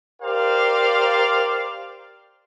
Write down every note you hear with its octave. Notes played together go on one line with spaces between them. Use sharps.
G4 A#4 C5 D5 F5